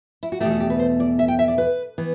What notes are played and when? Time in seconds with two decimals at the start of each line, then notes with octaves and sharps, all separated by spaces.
0.23 E4
0.32 F#4
0.40 E2 B2 A3 G4
0.51 F#4
0.60 G4
0.70 B4
0.79 C5
1.00 D5
1.19 E5
1.28 G5
1.39 E5
1.48 D5
1.58 B4
1.98 E3 B3